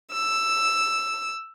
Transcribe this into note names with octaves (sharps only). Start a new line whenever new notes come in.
E6